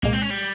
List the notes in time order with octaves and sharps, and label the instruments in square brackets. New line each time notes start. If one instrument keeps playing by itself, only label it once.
[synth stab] C2 A#2 G#3 [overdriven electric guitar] A#3
[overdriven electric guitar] C4
C#4
G3